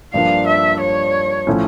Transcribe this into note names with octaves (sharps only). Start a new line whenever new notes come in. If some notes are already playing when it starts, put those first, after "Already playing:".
G2 F3 A#3 D4 F5
E5
C#5
A2 F3 A3 C#4 E4